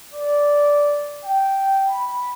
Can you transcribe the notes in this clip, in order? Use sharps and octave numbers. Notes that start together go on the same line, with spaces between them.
D5
G5
B5